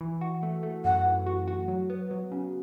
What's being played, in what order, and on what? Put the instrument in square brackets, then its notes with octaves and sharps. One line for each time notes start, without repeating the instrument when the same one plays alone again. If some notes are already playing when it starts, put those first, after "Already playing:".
[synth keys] E3
F#4
A3
A3
[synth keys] F#2 [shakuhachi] F#5
[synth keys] E3
F#4
F#4
F#3
B3
F#3
C#3